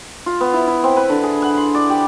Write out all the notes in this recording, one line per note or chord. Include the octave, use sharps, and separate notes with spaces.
F4
B3
E4
E4
C4
B4
D3
G#4
F#5
C6
D5
G4